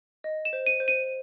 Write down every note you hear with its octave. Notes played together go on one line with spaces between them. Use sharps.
D#5
E7
C5
D#7
C5
D#7